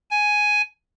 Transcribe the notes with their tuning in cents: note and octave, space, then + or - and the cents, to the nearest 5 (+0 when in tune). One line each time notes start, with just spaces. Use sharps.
G#5 +5